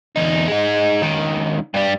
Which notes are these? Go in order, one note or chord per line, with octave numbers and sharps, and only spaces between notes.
E2 D#4
G#3 D#4
C#2 D#3
G2 G3